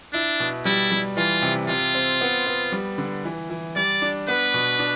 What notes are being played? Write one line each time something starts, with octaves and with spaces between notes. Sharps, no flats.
D4 E4
B2
G3 E4
G3
E3 F4
C3
C3 F4
C4
B3
B3
G3
D3
E3
E3
G3 D5
D4
B3 B4
B2
D4